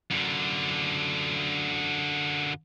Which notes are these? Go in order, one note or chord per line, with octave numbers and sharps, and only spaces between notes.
F#2 D3